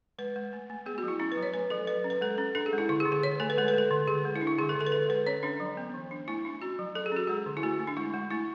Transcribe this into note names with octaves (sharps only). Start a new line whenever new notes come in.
G#3 B4
G#3
A3
A3
B3 G#4
F#4
F#3 E4
C#4 E4
B4
F#3
C#5
A3 B4
F#3 A4
F#3 B4
C#4
B4
G#3 A4
C#4
D4 A4
G#4
G#3
E4
D3 E4
G#4
D3
G#4
D3 C#5
A3 A4
B4
G#3 A4
B4
G#3 A4
D3
D3 G#4
G#3
E4
D4
E4
D3 G#4
A4
D3
A4
B4
D3 A4
G#3 B4
C#4 C#5
C#4 D4
F#3
B3
E3
D4
A3 E4
D4
C#4 F#4
F#3
F#3 A4
G#4
C#4 F#4
G#3 G#4
D3
E4
A3 F#4
A3
D4
G#3 E4
G#3
A3 E4